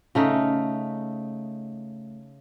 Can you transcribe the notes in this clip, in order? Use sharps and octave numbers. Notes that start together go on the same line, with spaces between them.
C#3 A3 D#4